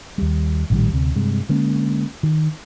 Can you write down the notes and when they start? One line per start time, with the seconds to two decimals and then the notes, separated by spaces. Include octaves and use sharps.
0.18 D#2 G3
0.70 A#1 A2 D#3 G3
0.93 D2 C3
1.15 G2 C3 G#3
1.49 D3 G#3 A#3 C#4
2.23 D#3